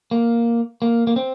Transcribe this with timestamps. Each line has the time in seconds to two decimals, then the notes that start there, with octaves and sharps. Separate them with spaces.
0.11 A#3
0.82 A#3
1.07 A#3
1.16 C4